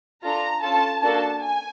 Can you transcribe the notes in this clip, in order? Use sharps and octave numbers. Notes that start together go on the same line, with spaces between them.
D4 F4 A4 A#5
C#4 F4 A4 A5
A#3 D4 F#4 A4 A5
G#5